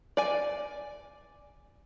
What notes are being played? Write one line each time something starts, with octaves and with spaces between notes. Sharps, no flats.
D5 G#5